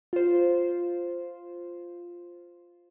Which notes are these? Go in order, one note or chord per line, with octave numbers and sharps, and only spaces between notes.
F4 C5